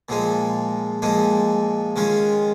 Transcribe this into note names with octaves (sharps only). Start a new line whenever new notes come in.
A#2 F3 G#3 D#4
A#2 F3 G#3 D#4
D#3 G#3 C#4 F4